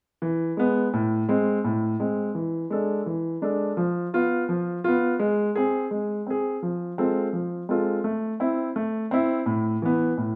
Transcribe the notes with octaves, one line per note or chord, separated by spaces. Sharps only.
E3
G#3 B3
A2
G#3 C4
A2
G#3 C4
E3
G#3 D4 A4
E3
G#3 D4 A4
F3
B3 F4
F3
B3 F4
G#3
C4 G#4
G#3
C4 G#4
F3
G#3 C4 F4 A4
F3
G#3 C4 F4 A4
A3
C4 E4
A3
C4 E4
A2
E3 B3
A2